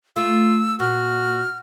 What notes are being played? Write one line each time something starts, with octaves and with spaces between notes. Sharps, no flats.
A3 F4 E6
A#2 F#4 F6